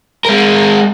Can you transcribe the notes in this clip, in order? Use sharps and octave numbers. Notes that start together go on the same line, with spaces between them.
G#3 A#4